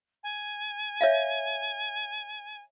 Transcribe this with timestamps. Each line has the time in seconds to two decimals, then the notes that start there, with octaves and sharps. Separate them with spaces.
0.23 G#5
1.01 C#5 E5 F5